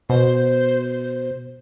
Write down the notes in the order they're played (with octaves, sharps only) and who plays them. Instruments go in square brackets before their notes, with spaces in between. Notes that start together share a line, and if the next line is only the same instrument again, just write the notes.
[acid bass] B2 [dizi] C5